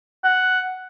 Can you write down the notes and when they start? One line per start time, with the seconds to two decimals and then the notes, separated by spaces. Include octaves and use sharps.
0.24 F#5